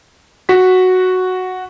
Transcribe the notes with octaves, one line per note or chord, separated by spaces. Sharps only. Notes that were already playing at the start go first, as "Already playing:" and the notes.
F#4 B6